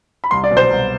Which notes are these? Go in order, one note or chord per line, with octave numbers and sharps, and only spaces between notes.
B5
C2 C6
D5
B2 F#3
C5
C2